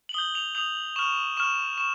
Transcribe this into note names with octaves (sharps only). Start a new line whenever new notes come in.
F#7
D#6 G6 G7
F7
D#6 G6 F7
C#6 F6 E7
C#6 F6 E7
C#6 E7